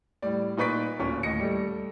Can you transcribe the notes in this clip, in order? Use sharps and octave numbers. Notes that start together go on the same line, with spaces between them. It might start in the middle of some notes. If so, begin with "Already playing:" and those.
A2 G3 D5
A#2 D#4 B4 C#6 B6 D7
D1 A#2 C#4 C#6
D#2 A2 D#5 A#6 C#7
G3 A3